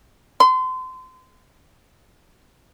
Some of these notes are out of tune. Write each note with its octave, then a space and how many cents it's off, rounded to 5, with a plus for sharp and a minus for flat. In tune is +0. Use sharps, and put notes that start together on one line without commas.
C6 -30